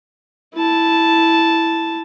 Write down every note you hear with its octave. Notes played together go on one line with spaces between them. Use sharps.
E4 A5